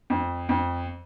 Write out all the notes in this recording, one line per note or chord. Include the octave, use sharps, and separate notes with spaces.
F2
F2